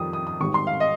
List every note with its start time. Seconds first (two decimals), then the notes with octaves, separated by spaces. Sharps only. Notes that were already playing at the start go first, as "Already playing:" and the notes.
Already playing: F2 D#3 G3 D#6
0.13 D#6
0.27 D#6
0.41 G#1 G#2 G3 C#6
0.54 C6
0.67 F5
0.80 D#5